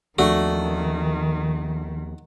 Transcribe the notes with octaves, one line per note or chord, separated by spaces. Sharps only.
D#2 D#3 F3 A3 D4 F#4